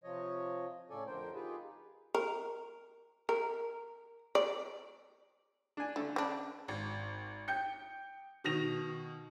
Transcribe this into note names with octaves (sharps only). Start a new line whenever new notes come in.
C3 F3 C#5 D#5
A2 C#3 C#4 A4 D5 G#5
F2 D3 A#4 C5 G5
D#4 F4 G4 G#4 B4
A#4
A#4
D5
D4 G#5
D3 A3
C#3 D4
G#1
G5 G6 C#7
B2 D#3 A#6 F7